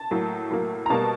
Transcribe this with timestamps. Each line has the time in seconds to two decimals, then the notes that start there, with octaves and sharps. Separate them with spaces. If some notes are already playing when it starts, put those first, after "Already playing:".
Already playing: A5
0.11 A2 F#3 A#3
0.51 A2 F#3 A#3
0.86 A#5
0.90 B2 G3 A#3 A5